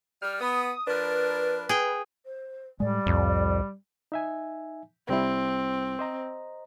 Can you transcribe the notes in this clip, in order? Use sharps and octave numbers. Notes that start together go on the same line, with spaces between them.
G3 F6
B3 D#6
F3 D4 A#4 B4
G#4 G5
C5
A2 G3 G#3 D5
C2 F2 A2
D#4 E5 G#5
C2 G3 C4 E4
C5 D#5 A#5